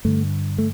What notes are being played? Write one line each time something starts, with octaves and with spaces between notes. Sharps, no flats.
G2 D3 A3
A3